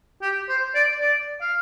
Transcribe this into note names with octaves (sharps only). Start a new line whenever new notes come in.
G4
C5
D5
D5
F5